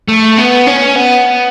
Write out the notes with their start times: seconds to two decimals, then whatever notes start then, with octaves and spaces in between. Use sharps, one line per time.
0.08 A3
0.38 B3
0.67 C#4
0.96 B3